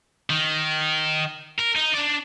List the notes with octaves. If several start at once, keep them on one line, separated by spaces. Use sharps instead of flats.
D#3
A#4
D#4
D4 D5